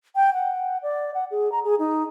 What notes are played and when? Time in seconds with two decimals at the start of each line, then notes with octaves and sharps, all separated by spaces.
0.15 G5
0.34 F#5
0.83 D5
1.14 F#5
1.31 G#4
1.52 A#5
1.64 G#4
1.79 D#4